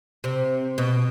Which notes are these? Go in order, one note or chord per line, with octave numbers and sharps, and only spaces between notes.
C3
B2